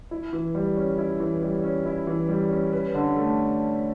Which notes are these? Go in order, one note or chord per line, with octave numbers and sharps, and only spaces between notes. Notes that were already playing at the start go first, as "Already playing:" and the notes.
E4
E3
G3
C#4
E4
E3
G3
C#4
E4
E3
G3
C#4
B4
D3
A3